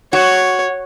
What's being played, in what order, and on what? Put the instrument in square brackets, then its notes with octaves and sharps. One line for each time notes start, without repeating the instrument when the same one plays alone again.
[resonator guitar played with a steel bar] F#4 [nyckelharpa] C#5